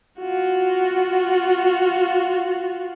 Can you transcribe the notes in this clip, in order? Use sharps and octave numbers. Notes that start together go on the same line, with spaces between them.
F4 F#4